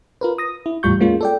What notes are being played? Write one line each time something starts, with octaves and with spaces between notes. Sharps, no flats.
F4 A#4 B4
D#6 A#6
E4
E2 A2 G3 F4 C#6 G6
G#3 A#3 C#4 F4
A4 D5 G5